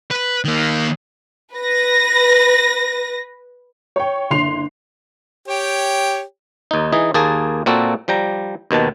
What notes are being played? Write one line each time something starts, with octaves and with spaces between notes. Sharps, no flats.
B4
D#3 A#3
B4 A#6
C#5 G5
F#1 D3 C6 C7 F7
G4 C#5 G5
D#2 D#4
E3 D#4 G#4
D#2 A#3 G#4 A5
A#2 A#3 C4 F#4 A4
F3 G3 G5 A#5
D#2 B2 D#3 A5